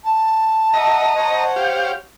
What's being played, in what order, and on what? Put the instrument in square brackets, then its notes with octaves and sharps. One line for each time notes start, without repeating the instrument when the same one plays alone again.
[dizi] A5
[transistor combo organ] D#5 A#5 [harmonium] E5 F#5
[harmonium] C5 C#5 F#5
[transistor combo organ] G4 F5